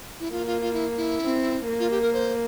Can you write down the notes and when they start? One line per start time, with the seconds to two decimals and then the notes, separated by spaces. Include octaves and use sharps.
0.20 E4
0.31 A#3 F4
0.47 F4
0.61 F4
0.73 E4
0.97 E4
1.22 C4
1.68 A#3
1.80 F4
1.91 G4
2.02 A#4
2.13 C5